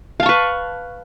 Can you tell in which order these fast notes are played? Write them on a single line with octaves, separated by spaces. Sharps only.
F5 A5 C#6 B4